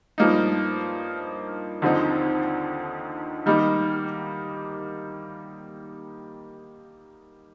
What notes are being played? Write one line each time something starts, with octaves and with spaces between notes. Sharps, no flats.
G2 F3 A#3 D#4
D#2 D3 F3 C4 D#4
D#3 G3 A#3 D#4